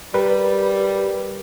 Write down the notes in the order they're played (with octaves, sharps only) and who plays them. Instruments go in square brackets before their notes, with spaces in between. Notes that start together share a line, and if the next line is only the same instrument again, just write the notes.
[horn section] G3 [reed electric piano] A#4 B4 B5